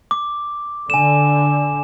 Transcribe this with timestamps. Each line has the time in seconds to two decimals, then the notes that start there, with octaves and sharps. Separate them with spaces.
0.11 D6
0.90 D3 G#5 E7